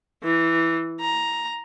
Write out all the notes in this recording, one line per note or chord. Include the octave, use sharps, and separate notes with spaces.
E3
A#5